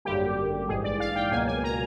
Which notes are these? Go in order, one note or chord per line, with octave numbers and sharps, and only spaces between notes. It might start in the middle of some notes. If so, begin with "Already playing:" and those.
G#1 F#2 D3 G3 A#3 G4
A#1 G#2 E3 G#3 G#4
D5
F5
G5
C#2 B2 F#3 A#3 G#5
G#5
A#5